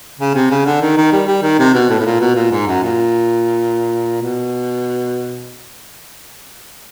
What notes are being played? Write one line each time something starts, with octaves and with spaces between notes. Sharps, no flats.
C#3
C3
C#3
D3
D#3
D#3
G3
G3
D#3
C3
B2
A2
A2
A#2
B2
A#2
G#2
F#2
A#2
B2